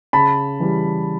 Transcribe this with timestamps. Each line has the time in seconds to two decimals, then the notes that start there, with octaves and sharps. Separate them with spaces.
0.13 C#3 A5 B5
0.60 E3 G3